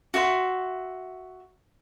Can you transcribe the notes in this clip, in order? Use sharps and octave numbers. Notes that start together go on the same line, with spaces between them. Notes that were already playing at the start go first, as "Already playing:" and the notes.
F#4 E5 C6